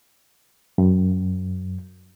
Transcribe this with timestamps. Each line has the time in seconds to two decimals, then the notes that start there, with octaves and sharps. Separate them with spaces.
0.78 F#2